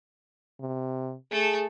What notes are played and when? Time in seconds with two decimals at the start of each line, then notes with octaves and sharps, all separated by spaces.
0.60 C3
1.31 A3 G#4 A4